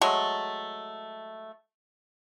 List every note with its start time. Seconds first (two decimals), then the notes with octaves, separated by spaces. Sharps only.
0.01 F#3 G#3 A3